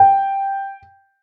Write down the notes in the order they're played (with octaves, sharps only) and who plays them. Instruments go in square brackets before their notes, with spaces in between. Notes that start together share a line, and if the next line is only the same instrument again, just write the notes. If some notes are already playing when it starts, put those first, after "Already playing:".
Already playing: [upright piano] G5